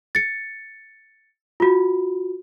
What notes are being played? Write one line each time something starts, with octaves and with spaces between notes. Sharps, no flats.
A6 C#7
F4 F#4